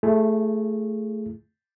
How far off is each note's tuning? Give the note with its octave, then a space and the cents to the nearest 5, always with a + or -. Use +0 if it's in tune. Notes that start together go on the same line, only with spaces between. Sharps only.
A3 +0 E4 +35 G#4 +0